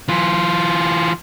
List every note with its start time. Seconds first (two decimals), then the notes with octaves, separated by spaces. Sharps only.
0.08 E3 F4